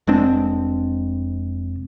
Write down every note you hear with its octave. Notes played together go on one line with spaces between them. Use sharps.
F1 G#3 C4 D4